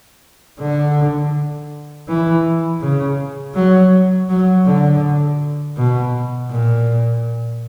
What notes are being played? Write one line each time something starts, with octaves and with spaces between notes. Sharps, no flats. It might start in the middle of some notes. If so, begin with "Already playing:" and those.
D3
E3
C#3
F#3
F#3
D3
B2
A#2